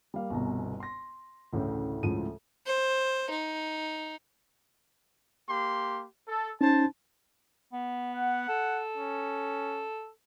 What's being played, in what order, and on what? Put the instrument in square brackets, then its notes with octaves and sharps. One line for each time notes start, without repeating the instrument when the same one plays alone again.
[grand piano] G3 A#3 F5
G1 C2 B2 A#5
C6 A#6
A1 D2 A2 C#3
D2 A2 C#3 F3 G#3 D#7
[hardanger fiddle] C5
D#4
[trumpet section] A#3 G4 C6
A4
[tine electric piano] C#4 D#4 [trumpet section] C5 A5
[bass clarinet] B3
[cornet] F#5
[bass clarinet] A4
[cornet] C#4